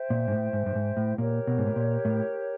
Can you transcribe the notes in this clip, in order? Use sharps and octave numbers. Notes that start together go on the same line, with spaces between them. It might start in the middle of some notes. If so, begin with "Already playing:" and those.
Already playing: C5 E5 G5
A#2
G#2
A2
G#2
G2
G#2
A2
A#2 G4 A#4 C#5
B2
G#2
A2
A#2
A2